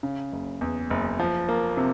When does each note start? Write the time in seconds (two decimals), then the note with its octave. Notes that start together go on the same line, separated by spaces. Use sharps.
0.03 C#3
0.32 F#1
0.61 E2
0.90 F#1
1.19 F3
1.49 A#3
1.77 C3